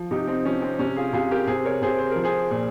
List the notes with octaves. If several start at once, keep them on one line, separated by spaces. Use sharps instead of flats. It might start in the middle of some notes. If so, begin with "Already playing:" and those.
Already playing: F3
C3 D#4 G4
C4 D#4
F3 C#4
C4
C3 C#4
F4 G#4
C3 F4 G#4
G4 A#4
C3 G#4 C5
A#4 C#5
C3 G#4 C5
C5
F3 A#4
G#4 C5
A#2